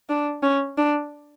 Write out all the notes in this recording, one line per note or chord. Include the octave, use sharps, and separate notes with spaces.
D4
C#4
D4